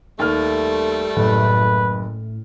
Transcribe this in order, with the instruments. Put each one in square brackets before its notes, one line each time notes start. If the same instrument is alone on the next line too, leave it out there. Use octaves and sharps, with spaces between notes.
[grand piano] D#2 F6 [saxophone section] G3 A3
[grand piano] F#1 [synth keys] A2 [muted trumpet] B4